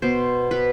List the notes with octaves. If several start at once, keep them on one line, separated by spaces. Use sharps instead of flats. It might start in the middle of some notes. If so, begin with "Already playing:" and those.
B2 B3 C5
B2 B3 B4